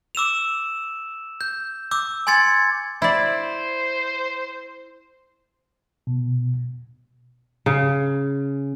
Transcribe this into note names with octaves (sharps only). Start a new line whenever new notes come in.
D6 E6 E7 F7
G6
D6 E6 G6
G#5 C6 G#6 A6 C#7
E4 C5 D5
B2
C#3